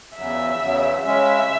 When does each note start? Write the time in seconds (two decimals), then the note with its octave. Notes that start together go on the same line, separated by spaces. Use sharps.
0.17 E2 C#3 F#3 E5
0.61 E2 C#3 F#3
1.04 C#3 G#3 C#4 E5